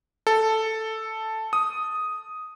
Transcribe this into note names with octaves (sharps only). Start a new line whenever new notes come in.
A4
D#6